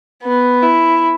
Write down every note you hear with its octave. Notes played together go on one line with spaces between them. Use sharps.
B3
E4